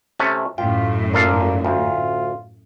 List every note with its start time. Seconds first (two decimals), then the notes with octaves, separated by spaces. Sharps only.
0.19 C3 A3 C#4
0.58 F#2 A2 F4 G5
1.14 A#2 A#3 A4 F5
1.65 D2 F4